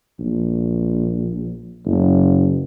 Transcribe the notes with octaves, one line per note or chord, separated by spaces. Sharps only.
A#1
F#1